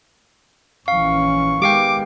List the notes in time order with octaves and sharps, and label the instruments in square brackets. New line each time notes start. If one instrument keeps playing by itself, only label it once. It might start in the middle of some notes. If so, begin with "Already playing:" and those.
[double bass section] A#1 E3 C#4 [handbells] F5 [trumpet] C#6
[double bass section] D#3 G#3 B3 [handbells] G4 F5 G5 [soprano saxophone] D6